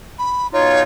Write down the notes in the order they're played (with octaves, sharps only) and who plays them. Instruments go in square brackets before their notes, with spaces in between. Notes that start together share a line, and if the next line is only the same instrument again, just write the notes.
[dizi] B5
[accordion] B2 D#4 F4 [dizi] C#5